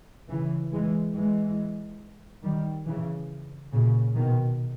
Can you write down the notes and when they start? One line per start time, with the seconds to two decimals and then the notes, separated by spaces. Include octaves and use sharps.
0.29 C#3 E3
0.72 E3 G#3
1.15 E3 G#3
2.43 D#3 G3
2.86 C#3 E3
3.72 A#2 C#3
4.15 B2 D#3